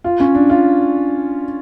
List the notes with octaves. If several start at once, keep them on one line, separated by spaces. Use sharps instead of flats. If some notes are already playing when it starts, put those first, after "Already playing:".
F4
C#4
D4
F4